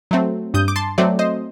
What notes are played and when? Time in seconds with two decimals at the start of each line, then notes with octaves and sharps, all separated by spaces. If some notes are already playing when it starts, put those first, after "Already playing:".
0.11 F#3 A3 C4
0.54 G2 D#6 G6
0.68 D6
0.76 A5 C6
0.98 F#3 A3 C4 D5
1.19 C5 D#5